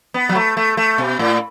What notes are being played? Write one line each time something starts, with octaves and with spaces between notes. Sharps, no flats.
B3
F#3
A3
A3
A3
B2
A2